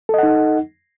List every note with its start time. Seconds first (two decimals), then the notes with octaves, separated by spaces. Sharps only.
0.09 A4
0.14 D#5
0.18 F#5
0.23 D#4